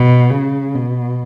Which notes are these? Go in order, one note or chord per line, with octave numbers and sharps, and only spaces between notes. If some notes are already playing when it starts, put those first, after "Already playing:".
Already playing: B2
C#3
B2